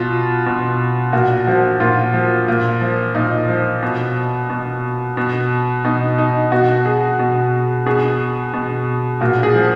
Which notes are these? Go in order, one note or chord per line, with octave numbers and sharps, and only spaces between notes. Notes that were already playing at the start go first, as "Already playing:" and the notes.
Already playing: B2 F4
B2
A#2 F#4
F3 F#4
A#2 F4
F3
A#2
F3
A#2 D#4
F3
B2
B2
B2
B2 D#4
D#4
B2 F#4
G#4
B2
B2 G#4
B2
A#2 F#4
G#4
F3